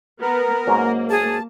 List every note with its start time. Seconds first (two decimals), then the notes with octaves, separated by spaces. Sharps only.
0.21 B3 A#4
0.67 G#2 F#3 A#3 C#4
1.10 G#4 A5